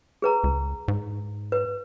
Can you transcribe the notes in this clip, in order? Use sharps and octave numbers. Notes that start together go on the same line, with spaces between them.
G#4 B4 A#5
C#2
G#2
B4